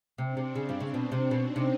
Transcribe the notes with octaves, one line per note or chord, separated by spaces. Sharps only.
C3 C4 D4
C3
C#3
G2 G3
C#3
B2 C4 D4
C3
B2 C#4 D#4
C3